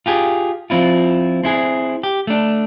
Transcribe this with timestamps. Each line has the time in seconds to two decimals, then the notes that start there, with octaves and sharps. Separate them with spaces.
0.06 F4 G4 G#4
0.70 F3 C4 E4 F4
1.43 C4 E4 G#4
2.03 G4
2.27 A3 D4